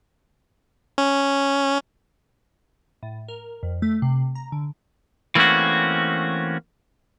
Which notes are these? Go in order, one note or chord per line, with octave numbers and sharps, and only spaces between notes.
C#4
A2
A#4
F2
A3
C3
A#5
D3
E3 A3 A#3 C4 C#4 F#4